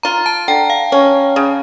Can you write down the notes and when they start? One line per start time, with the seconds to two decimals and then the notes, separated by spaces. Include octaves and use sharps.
0.03 F4 A#5
0.26 A5
0.48 D3 G5
0.70 F5
0.92 C#4
1.36 C#3